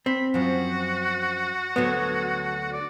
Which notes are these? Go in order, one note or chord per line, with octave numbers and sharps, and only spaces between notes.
C4 B5
F#2 F3 F#4
D2 D3 F#3 B3
D5